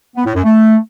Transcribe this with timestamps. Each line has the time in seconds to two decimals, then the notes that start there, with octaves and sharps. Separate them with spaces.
0.16 B3
0.25 A2
0.35 F#2
0.44 A3